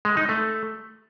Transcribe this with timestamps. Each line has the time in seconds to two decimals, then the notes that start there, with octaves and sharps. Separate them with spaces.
0.05 G#3
0.17 D#4
0.29 A3